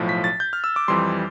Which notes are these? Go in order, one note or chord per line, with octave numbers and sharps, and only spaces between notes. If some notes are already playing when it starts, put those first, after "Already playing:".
Already playing: B1 A2 F3
B6
A6
G6
F6
E6
D6
F2 E3 G3 C6